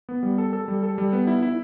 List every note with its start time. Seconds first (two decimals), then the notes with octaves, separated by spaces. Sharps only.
0.09 B3
0.23 G3
0.38 A4
0.53 A4
0.68 G3
0.83 A4
0.98 G3
1.13 B3
1.27 E4
1.42 E4